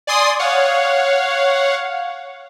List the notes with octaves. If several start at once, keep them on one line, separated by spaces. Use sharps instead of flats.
D5 G#5 C6 D#6
C#5 F5 F#5